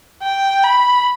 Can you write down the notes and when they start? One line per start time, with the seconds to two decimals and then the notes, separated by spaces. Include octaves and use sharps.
0.23 G5
0.64 B5